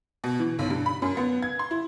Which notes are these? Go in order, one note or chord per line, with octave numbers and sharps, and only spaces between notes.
B2
E3
B1
G2
B5
F#2
B3
G#6
C6
E4